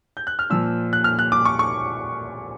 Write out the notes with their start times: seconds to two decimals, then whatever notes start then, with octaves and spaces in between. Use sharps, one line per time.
0.17 G6
0.27 F#6
0.39 F6
0.50 A#2 F3 E6
0.93 F#6
1.04 F6
1.19 F#6
1.32 D6
1.45 C#6
1.59 C#6